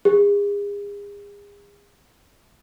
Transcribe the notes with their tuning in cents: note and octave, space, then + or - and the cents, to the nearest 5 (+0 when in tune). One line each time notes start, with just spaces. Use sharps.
G#4 -40